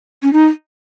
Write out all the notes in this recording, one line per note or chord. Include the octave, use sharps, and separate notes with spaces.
C#4
D#4